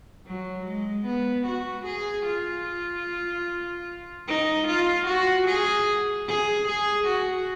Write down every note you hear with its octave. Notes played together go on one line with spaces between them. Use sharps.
F#3
G#3
B3
F#4
G#4
F4
D#4
F4
F#4
G#4
G#4
G#4
F#4